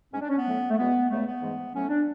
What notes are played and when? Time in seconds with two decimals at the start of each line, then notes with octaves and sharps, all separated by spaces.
0.13 G#2 G#3 C#4
0.21 D4
0.30 C#4
0.37 B3
0.45 A2 F#3 A3
0.70 A3
0.77 E2 B2 G#3 B3
1.09 E2 C#3 G#3 A3
1.26 B3
1.42 G#2 E3 G#3
1.74 A2 F#3 A3 C#4
1.88 D4